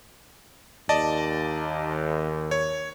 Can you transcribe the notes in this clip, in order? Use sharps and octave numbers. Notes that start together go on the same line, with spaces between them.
D#2 D5 D#5 A5
C#5